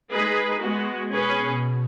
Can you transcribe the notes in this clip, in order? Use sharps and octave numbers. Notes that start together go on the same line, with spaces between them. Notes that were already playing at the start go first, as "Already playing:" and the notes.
G#3 D#4 G#4 B4
G#3 B3 F#4
B2 C#4 G#4 B4